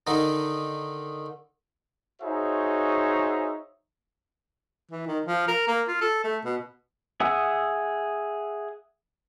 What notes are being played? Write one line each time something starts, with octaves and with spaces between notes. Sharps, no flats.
D3 D#3 D#4
D#4 F#4 G#4 C5 C#5 E5
E3
D#3
F3
A#4
A#3
F4
A4
A3
B2
G#4 E5 F#5 D#6 E6